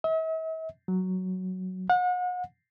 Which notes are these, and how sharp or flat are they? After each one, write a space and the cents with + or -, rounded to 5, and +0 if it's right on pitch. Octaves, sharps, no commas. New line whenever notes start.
E5 -45
F#3 +5
F#5 -40